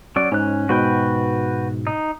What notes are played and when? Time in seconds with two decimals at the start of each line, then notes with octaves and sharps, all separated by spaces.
0.16 F#3 C#4 D5
0.32 G#2 C#4 F#6
0.69 G#2 B2 F#4 B4 G5
1.87 D#4